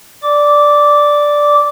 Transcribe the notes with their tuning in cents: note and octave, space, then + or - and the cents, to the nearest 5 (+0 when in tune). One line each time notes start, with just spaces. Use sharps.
D5 +0 D6 -10